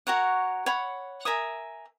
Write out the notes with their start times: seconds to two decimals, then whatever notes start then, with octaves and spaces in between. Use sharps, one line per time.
0.07 F#4 A#4 C#5 F#5
0.66 C#5 F#5 B5
1.25 A#4 E5 G#5 D#6